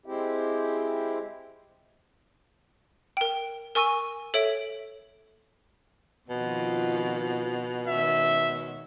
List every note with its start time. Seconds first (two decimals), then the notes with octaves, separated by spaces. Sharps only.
0.06 G#3 C4 E4 G4
3.17 A#4 G5
3.75 A#4 G#5 C#6 E6 D#7
4.34 A4 C#5 E5 D7 F#7
6.29 F2 B2 D#3 F4
7.88 D#3 G#3 C#4 E5